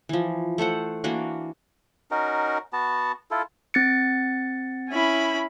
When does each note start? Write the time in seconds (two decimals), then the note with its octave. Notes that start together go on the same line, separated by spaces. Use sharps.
0.09 E3 F3
0.58 A3 A4 C5 F#5
1.04 E3 A#3 D4 F#4
2.11 C#4 D#4 F#4 A#4
2.73 B3 F#4 A5
3.31 E4 F4 A4
3.74 C4 A6 C#7
4.89 C#4 E4 B5